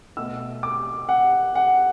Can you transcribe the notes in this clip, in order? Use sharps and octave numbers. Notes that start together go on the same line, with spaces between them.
B2 A3 E6
D6
F#5
F#5